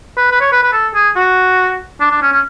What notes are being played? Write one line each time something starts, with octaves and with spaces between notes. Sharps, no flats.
B4
B4
C#5
B4
B4
A4
G#4
F#4
D4
D4
C#4
C#4